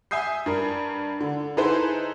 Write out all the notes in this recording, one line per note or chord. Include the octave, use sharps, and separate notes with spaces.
E5 G#5 D#6 G6 C7
G2 A#4
D3
D#4 E4 G#4 A4 B4 C5